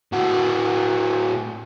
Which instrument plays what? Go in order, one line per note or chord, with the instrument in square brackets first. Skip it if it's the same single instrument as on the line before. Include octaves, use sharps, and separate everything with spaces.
[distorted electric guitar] A2 F#4